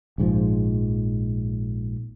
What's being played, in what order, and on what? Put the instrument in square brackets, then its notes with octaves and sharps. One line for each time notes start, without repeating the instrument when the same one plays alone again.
[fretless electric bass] A#1 G#2 E3 F3